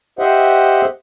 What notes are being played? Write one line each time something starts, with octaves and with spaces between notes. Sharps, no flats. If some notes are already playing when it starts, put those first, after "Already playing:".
G4 C5 D#5 E5 F#5